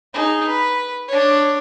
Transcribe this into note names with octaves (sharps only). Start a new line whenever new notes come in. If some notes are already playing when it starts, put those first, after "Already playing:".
D#4 G#4
B4
D4 C#5